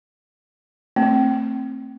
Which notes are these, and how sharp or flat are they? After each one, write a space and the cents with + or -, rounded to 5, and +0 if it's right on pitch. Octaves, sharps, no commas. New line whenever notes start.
A3 +35 C4 +20